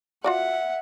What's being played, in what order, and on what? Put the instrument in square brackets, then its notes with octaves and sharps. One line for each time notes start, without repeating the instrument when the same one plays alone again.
[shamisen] F4 F#4 D5 [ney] E5 [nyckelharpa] F#5